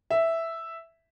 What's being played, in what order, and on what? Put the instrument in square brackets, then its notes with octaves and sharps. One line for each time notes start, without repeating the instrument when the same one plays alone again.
[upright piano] E5